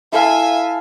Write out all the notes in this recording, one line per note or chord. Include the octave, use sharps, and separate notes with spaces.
E4 A4 E5 F5 G#5